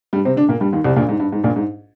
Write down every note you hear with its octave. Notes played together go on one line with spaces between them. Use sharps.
G2 G3
C3 C4
D3 D4
A#2 A#3
G2 G3
D#2 D#3
C2 C3
A#1 A#2
G#2
G2
G#2
A#1 A#2
G#2